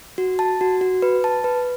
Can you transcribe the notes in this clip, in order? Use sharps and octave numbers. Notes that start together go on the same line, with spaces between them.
F#4
A5
F#4
F#4
B4
A5
B4